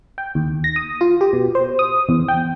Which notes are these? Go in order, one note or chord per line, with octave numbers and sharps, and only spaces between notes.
G5
D#2
A#6
D#6
F4
G4
B2
C5
D#6
E2
G5